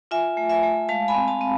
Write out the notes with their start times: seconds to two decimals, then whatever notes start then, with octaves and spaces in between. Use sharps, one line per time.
0.11 F4 E5 G#5
0.37 A3
0.50 E5 G#5
0.63 A3
0.89 G#3 F5 A5
1.08 G#5 B5
1.15 C4
1.28 F5 A5
1.41 C4